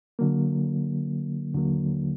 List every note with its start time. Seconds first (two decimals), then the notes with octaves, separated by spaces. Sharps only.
0.19 D3 F#3 A#3
1.54 D#2 D3 F#3 A#3